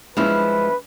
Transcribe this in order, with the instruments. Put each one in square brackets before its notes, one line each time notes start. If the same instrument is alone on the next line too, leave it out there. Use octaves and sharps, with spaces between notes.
[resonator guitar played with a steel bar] G2 F3 E4 [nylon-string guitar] G#3 C#4 [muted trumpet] B4